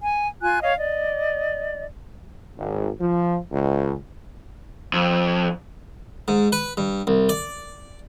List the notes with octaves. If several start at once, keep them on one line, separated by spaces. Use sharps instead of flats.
G#5
F4 G#5 F#6
C#5 D#5 F5
D5 D#5
G#1
F3
C#2
F2
G#2
B4
G2
C2
D5